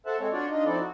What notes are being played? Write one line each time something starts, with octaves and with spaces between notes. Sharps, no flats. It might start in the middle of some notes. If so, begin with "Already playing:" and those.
A4 C5 E5 F#5 A5
G#3 C4 A4 C#5
D4 F4 F#4 C#5 D5
D4 D#4 F4 D#5
F3 C4 D#4 E4 A4 D5
F#4